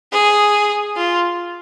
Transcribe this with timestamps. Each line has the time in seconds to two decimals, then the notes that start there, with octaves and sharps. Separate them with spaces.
0.12 G#4
0.96 F4